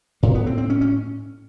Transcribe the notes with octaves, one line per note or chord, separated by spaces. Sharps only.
A2 A#3
B3
C4
C4
C#4
C#4